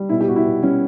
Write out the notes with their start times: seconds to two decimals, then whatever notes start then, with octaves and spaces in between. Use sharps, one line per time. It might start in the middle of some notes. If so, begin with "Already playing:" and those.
Already playing: G3
0.09 B2 E4
0.21 G4
0.28 B2 F#4
0.36 E4
0.45 B2
0.63 G3 C#4